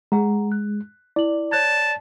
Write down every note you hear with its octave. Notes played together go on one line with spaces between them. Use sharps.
G#3 G#4 F#5 A#5
F#6
E4 D5 F#7
C#5 A5 F#6 G#6